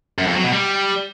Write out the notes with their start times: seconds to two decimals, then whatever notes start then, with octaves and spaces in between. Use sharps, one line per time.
0.18 F#2
0.27 F2
0.35 F#3
0.44 B2
0.52 G3